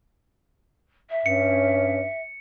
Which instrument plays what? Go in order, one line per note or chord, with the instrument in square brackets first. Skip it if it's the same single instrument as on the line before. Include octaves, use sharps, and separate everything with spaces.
[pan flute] E5
[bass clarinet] G2 [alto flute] C#4 [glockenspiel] C#7